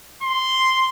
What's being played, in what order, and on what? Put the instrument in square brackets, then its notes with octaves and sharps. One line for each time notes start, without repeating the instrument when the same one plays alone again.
[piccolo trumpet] C6